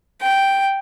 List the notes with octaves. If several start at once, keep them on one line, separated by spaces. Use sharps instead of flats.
G5